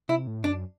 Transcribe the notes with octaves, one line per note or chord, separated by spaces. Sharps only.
C3 E4
A2
F#2 D4